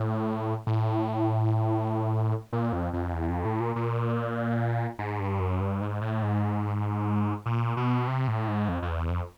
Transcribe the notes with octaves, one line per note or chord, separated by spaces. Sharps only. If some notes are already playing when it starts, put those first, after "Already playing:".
Already playing: A2
A2
A#2
F2
F2
E2
F2
A2
A#2
A#2
G#2
G2
F#2
G2
G#2
A2
G#2
A#2
B2
C3
A2
G#2
F2
F2
E2
F2